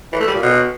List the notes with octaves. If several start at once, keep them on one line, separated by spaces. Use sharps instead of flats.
E3
A3
G3
A#2
B2